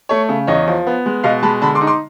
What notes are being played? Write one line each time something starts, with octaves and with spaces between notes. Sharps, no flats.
A3 C#5
C#3
E2 C#5 D#5
F3
B3
G#3
B2 D#5 F5
G#3 A5 B5
D3 A5 B5
C6 D6
D#4
C6 D6